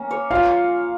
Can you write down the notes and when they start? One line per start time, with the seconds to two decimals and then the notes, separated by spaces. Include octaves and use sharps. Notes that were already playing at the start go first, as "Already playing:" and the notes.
Already playing: A#3 C#4
0.11 C#5
0.31 F4 F5